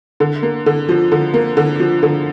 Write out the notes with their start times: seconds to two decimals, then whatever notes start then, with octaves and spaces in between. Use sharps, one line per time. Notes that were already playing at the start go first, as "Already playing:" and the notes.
0.20 D3
0.43 A#3
0.66 D3
0.89 F3
1.12 D3
1.34 A#3
1.57 D3
1.80 F3
2.03 D3